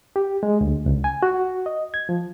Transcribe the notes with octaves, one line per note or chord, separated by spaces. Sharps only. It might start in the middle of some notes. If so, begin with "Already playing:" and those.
G4
G#3
D2
C#2
G#5
F#4
D#5
G#6
F3